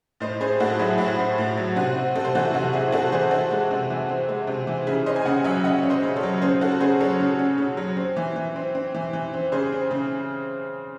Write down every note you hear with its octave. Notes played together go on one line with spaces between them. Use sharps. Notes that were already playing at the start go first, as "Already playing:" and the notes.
A2 C5 D#5
C4 G#4 C5
A2 F#4 A4
F#3 E4 G#4
A2 F#4
C4
A2
F#3
C3 F#4
C4
C3 A4
C5
E3 F#4 A4
C3 F#4
C4 E4 G#4
C3 F#4 A4
E3 G#4 C5
C4 F#4 A4
G#3
C3
E3
C4
G#3
C3
E3
C#3 E4 G#4
C#4 C5 D#5
G#5
C#3 D#5 F#5
F#3 E5 G#5
C#3 D#5 F#5
C#4
C5 D#5
C#3
A4 C#5
F#3
C#3 G#4 C5
C#4 F#4 A4
C#3 G#4 C5
F#3 A4 C#5
C#3
C#4
C#3
F#3
C4
E3
E3
C4
C4
E3
E3
C4
C#3 G#4 C5
C4
C#3